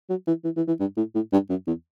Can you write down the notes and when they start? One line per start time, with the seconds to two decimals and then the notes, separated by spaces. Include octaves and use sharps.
0.10 F#3
0.27 E3
0.44 E3
0.56 E3
0.68 E3
0.80 G2
0.97 A2
1.15 A2
1.33 G2
1.50 F#2
1.67 E2